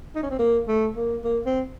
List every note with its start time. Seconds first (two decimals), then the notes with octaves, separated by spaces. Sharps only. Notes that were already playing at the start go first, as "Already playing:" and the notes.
0.15 D#4
0.23 C#4
0.31 C4
0.39 A#3
0.68 A3
0.96 A#3
1.24 A#3
1.46 C4